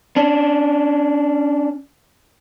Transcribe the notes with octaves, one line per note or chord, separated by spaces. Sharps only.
C#4 D4